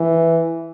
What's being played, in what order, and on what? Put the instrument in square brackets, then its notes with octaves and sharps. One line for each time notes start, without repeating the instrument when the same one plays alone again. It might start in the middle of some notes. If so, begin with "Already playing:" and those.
Already playing: [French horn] E3